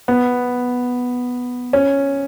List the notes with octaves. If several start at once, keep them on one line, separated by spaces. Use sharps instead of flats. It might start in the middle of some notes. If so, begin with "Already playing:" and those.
B3
C#4